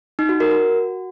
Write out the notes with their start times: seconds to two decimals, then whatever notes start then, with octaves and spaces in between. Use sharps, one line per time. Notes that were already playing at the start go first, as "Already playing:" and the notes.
0.19 D#4
0.29 F#4
0.40 F#4 A#4
0.51 F#4